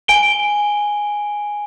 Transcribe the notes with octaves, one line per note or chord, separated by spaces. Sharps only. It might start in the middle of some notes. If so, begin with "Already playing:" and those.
G#5 D7 G7